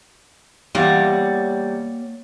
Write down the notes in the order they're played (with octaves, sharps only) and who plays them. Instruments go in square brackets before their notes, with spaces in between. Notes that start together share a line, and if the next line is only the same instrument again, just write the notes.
[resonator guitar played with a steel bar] E2 G3 [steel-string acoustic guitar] A#3 C#5 F#5